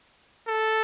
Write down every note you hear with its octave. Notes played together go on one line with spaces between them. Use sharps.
A4